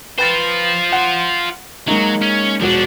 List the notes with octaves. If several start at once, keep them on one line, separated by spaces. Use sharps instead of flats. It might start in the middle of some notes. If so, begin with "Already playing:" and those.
F4 B4 C5 G5 A6
F#5
F#3 G#3 A#3 D#4
C#4
E1 F3 D4 F#4